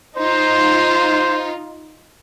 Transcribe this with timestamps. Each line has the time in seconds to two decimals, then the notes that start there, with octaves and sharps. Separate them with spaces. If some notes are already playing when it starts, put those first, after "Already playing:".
0.17 D#4 F4 C5